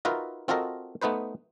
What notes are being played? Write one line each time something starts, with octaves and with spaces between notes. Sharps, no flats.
D#4 F4 F#4 A#4 B4 E5
C4 F4 F#4 A4 A#4 D#5
A3 B3 D#4 B4 C5